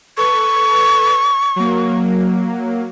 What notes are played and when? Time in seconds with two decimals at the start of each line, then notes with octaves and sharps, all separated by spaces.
0.17 A4 B4 C#6
1.56 F#3 A#3